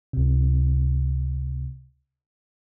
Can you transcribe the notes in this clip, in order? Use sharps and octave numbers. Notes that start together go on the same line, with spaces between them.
C#2 C3